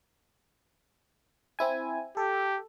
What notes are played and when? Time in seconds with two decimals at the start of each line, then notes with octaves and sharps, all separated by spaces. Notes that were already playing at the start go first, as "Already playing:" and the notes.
1.59 C4 E4 G#5
2.17 G4 A4